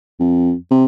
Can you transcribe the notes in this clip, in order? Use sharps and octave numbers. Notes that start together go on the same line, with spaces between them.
F2
C3